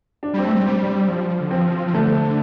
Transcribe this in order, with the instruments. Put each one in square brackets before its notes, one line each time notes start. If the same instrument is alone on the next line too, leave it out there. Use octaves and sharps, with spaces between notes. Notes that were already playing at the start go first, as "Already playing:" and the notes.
[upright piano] D4
[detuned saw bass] G3 [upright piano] C4
[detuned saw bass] A3
[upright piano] C4
[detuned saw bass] G3
[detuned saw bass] G3 [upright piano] C4
[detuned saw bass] F3
D3
[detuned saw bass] F3 [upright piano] C4
[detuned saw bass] F3
[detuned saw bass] D3 [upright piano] A3